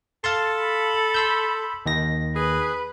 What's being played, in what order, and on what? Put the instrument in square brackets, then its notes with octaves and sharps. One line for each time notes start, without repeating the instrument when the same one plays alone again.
[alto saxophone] A4 [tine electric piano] F5 A5 C6
[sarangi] B5
[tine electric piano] C6 E6 G6
D#2 D#3 A#6
[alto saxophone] G#4 [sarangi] B4